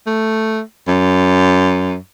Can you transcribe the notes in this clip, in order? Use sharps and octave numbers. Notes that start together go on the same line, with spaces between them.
A3
F#2